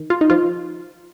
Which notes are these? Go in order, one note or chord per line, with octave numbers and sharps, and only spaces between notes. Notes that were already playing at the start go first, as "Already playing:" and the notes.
Already playing: D#3
F4
D#4
F3 F4